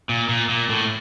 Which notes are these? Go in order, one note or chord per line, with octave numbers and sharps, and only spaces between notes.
A#2
A#2
A#2
A2